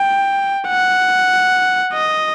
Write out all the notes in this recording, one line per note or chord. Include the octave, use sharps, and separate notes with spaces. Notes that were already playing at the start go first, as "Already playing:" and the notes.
Already playing: G5
F#5
D#5